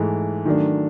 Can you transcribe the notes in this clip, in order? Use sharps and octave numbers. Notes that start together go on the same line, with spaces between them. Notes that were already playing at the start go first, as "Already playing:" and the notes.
Already playing: G#2 E3 A3
D#3 F#3 A3 D4